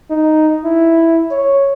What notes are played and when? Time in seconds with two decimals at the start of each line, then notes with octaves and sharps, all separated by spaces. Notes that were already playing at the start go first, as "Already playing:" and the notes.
0.10 D#4
0.65 E4
1.31 C#5